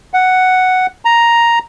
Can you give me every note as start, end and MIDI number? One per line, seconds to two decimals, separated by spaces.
0.14 0.87 78
1.05 1.59 82